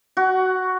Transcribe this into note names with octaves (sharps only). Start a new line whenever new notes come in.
F#4